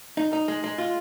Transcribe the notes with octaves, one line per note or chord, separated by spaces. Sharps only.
D#4
D#4
G#3
G#3
F4